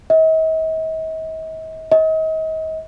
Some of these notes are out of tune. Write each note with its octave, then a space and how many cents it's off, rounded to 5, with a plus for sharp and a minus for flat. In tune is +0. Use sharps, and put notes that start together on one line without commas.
D#5 +45
D#5 +35